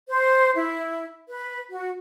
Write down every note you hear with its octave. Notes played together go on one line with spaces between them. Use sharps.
C5
E4
B4
F#4